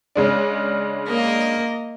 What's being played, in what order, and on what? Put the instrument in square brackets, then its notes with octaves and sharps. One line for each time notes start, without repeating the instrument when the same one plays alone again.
[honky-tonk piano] C#3 G#3 D4
[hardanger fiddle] A#3 D#5